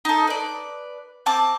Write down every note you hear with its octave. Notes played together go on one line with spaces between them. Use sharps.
D#4 A4
B4 D5
C4 A5 D6